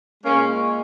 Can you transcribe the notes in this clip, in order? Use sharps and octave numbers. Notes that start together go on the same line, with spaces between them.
A#2 G#3 A#3 C#4